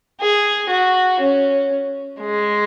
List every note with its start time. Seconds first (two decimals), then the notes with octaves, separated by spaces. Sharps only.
0.21 G#4
0.70 F#4
1.20 C#4
2.20 G#3